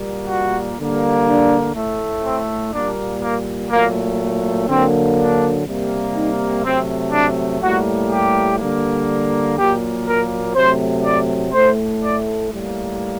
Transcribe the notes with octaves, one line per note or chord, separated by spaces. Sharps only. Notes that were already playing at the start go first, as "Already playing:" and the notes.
Already playing: A#2 G3 A#3
F#4
D3 G3 A#3
D4
A2 A3
C4
A#2 G3 A#3 D4
A#3
A#2 F#3 A3 A#3
D3 F#3 A#3 C4
D4
C3 G3 A#3
D#4
C3 F#3 A3 C4
D4
A2 G3 A#3 F#4
G4
D3 G3 A#3
A#2 F#3 A#3 G4
A#4
C3 F#3 A3 C5
D5
A2 A3 C5
D5
A2 G3 A#3